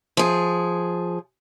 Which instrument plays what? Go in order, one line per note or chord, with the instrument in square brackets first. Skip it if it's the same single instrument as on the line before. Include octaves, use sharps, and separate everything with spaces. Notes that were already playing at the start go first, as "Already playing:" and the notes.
[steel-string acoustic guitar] F3 G#4